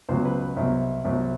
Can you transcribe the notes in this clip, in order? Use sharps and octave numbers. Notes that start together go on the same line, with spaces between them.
C#2 B2 F#3 C5
B4
C2 B2 F#3
C2 B2 F#3